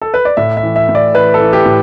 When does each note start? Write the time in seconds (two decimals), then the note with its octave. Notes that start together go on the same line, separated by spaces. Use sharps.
0.02 A4
0.14 B4
0.25 D5
0.37 A2 E5
0.57 E5
0.63 E3
0.76 E5
0.89 A2
0.95 D5
1.14 E3 B4
1.34 A4
1.40 E3
1.53 G4
1.66 A2